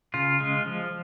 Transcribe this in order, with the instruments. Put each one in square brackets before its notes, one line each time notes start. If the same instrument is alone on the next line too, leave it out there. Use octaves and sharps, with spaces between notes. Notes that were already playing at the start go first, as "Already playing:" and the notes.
[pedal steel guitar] C#3 F4
G#3
F3